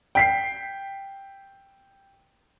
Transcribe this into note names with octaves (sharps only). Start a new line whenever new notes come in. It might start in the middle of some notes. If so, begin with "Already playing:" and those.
G5 B6 C7